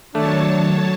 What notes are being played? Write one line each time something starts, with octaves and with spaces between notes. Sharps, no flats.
D#3 F#3 A3 D4 C#5 A5